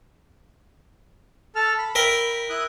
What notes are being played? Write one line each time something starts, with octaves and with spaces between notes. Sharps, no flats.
A4 A5 F6
B5
A#4 E5 G5
E4 D#6 F#6